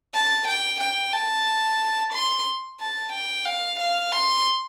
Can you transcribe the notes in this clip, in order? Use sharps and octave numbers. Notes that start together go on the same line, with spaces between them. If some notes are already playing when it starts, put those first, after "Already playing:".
A5
G5
G5
A5
C6
A5
G5
F5
F5
C6